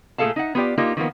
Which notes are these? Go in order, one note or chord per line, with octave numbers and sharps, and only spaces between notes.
A#2 A3 G#4 A4 F5 A5
D#4 E5 F#5
B3 F4 G4 D5
A#3 D#4 F4 G4
D#3 F3 A#3 B3